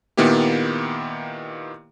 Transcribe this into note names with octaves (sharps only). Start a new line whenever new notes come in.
A#2 D#3 A#3 B3 E4 G4